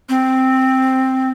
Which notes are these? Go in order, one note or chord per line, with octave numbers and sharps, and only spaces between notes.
C4